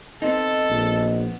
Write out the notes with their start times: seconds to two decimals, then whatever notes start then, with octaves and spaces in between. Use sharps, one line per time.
0.22 B3 C4 D#4 A4 D#5
0.70 A#1